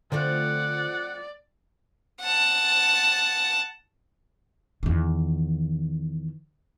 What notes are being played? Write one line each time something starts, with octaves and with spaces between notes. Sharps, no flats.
D3 F3 A3 C4 D5 F#5
F#5 A5
E2 D#3